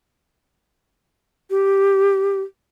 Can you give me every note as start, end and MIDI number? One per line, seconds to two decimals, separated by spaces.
1.50 2.41 67